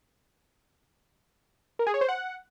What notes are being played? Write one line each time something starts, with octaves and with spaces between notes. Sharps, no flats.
A#4
G#4
C#5
C5
F#5